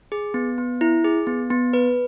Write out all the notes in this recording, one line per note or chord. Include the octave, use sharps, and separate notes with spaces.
G#4
B3
B3
E4
G#4
B3
B3
B4